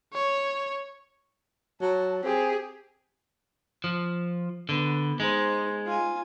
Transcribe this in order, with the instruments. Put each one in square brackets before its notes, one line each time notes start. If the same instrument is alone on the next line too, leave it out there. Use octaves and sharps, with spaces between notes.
[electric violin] C#5
[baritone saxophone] F#3 [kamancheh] A5
[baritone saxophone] C4 [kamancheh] G4 G#4
[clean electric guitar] F3
[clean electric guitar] D3 [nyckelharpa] B3
[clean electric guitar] G#3 [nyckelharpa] D#4 C5
[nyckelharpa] F4 G#5